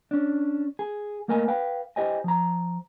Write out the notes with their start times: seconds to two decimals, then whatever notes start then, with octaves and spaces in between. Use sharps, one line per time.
0.11 C#4 D4
0.79 G#4
1.28 A3 A#3 A#4 D#5 G#5
1.48 B4 F5 G5
1.96 E4 G4 C5 D#5 G5 G#5
2.24 F3 A#5